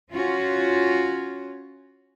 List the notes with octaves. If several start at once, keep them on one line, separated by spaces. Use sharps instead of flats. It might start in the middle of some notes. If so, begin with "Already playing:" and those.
C#4 F4 F#4